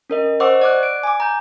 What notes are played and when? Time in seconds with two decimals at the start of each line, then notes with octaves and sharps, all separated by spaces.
0.10 C#4 A#4 D#5
0.40 C5 D#5 F#5 C#6 D6 E6
0.61 D5 D6 F#6
0.83 D7
1.03 G#5 D6
1.20 A#5 G6